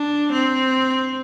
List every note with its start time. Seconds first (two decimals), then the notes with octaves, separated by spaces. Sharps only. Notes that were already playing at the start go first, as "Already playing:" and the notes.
Already playing: D4
0.32 C4